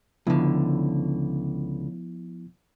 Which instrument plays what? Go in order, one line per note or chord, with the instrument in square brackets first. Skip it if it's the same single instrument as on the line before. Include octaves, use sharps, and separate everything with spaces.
[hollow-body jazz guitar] C#2 D3 [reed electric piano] F3 B3 E4